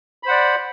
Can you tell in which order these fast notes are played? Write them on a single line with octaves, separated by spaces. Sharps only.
B5 C5 F#5 D5